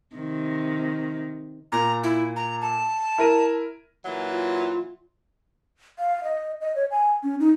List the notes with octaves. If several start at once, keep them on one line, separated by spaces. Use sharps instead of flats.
C3 D#3
A#2 A#5
E4
A#5
A5
E4 A#4 D#7
A#2 E3 F#3
F4
F5
D#5
D#5
C#5
G#5
C#4
D#4